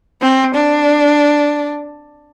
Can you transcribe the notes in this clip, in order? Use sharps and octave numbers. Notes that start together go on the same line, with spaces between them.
C4
D4